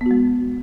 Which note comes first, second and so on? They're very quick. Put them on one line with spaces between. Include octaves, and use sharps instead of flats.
B3 F#4 G#3